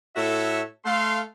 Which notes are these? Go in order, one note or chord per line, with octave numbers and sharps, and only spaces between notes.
A2 F#4 A4 C#5 E5
A3 F5 C6